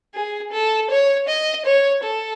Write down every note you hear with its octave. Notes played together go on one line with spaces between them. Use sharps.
G#4
A4
C#5
D#5
C#5
A4